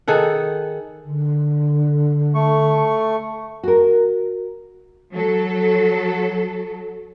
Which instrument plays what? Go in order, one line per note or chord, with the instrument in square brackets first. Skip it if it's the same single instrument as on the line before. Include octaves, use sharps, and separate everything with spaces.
[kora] D#3 G#4 A4 F#5
[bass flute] D3
[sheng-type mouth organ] A3 C#6
[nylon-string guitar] F#4 A#4
[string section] F#3 A4